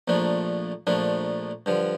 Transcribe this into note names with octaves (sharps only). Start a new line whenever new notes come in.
A#1 A#2 F3 A3 D4
A#1 A#2 F3 A3 D4
G2 D3 F3